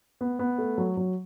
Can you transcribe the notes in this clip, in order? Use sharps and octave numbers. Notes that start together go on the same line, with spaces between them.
B3
B3
A3
F#3
F#3